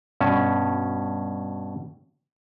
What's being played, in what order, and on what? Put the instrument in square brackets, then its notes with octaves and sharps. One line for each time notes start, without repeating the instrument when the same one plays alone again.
[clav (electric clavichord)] G2 B2 C#4 A5